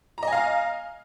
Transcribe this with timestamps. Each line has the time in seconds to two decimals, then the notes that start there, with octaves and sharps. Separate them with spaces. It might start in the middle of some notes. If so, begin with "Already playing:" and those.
0.18 A#5
0.23 D#5
0.28 G#5
0.32 F5